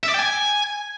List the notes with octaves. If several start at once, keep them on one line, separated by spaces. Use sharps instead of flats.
E5
D5
G5
G#5